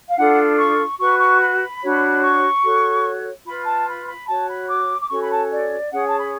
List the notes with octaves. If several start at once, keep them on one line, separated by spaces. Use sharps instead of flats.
F5
D4 F4 A4 F#5
C#6
F#4 B4 C#6
C#6
B5
D4 F#4 C#5
C#6
F#4 A4 C#5
F4 B4 B5
A5
B5
B5
F#4 C#5 A5
B5
D6
D6
C#4 F#4 A4 C#5 C#6
B5
A5
D5
C#4 G#4 C#5 F#5
A5
B5